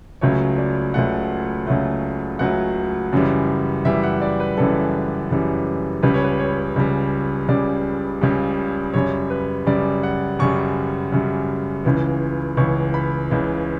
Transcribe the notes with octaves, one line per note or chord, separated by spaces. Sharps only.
C#2 C#3 F#3 A3 C#5
D5
C#2 C#3 F#3 A3 F#5
C#2 C#3 F#3 A3
C#2 C#3 F#3 A3 F#5
F#2 C#3 E3 G3
F#2 C#3 E3 G3 E5
F#5
D5
B4
F#2 C#3 E3 G3 A4
F#2 C#3 E3 G3
C#2 C#3 G3 B4
C#5
B4
C#5
C#2 C#3 G3
C#2 C#3 G3 D5
C#2 C#3 G3
F#2 C#3 G3 C#5
B4
F#2 C#3 G3 D5
F#5
F#2 C#3 G3 C#6
F#2 C#3 G3
C#2 C#3 E3
C#2 C#3 E3 C#6
B5
C#2 C#3 E3